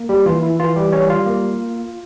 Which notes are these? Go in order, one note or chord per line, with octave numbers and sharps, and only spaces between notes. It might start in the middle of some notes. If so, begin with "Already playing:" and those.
Already playing: A#3
G3 G4
E3 F4
E4
E3 F4
G3 G4
G3 C#4 C#5
F4 F5
A#3